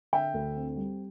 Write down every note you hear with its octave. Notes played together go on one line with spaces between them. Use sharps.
D3 E5 G5
D2
C4
G3